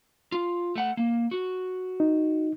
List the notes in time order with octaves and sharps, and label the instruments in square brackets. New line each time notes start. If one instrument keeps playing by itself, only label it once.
[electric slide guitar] F4
A3 F#5
A#3
F#4
[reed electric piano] D#4